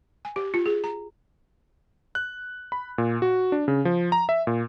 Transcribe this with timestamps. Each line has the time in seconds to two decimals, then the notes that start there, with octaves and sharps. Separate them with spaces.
0.25 G#5
0.36 G4
0.54 F4
0.66 G#4
0.84 A#5
2.15 F#6
2.72 B5
2.98 A#2
3.22 F#4
3.52 D4
3.68 C#3
3.85 F3
4.12 A#5
4.29 E5
4.47 A#2